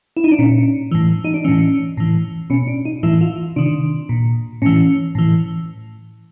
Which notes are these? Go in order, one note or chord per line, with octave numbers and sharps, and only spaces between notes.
E4
D#4
D4
A#2 C#4
A2 E3
D#4
D4
A2 E3 C#4
A2 E3
B2 C#4
D4
D#4
A2 E3 E4
F4
C3 D#3 D4
A#2
A2 E3 C#4
A2 E3